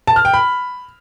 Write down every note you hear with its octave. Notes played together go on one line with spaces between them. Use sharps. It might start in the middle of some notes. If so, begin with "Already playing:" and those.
A5
F6
G5
B5